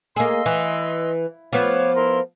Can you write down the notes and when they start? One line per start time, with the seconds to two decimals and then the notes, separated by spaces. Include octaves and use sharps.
0.16 A#3 G#4 D#5 C6 E6
0.46 E3
1.53 F3 B3 C#5 F5 D6
1.95 E4 A#4 C6